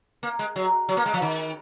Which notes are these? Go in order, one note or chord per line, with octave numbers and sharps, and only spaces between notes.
A#3
G#3
F#3
F#3
A#3
G#3
F3
D#3